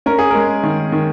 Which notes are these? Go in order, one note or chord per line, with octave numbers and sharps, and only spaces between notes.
C#4 A#4
G#4
G#3 A#4
D#3
D#3